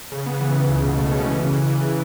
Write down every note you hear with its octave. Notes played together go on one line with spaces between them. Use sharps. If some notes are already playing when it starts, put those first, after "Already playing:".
C#3
B3
E3
C#3
C#2
B2
A3
C#4
E3
C#3
E3
E3